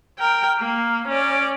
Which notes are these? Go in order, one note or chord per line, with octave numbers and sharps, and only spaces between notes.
A#4 G5
A#3
C#4 D5